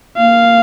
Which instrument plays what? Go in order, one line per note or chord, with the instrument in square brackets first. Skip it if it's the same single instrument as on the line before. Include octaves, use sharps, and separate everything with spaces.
[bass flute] A#3 [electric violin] F5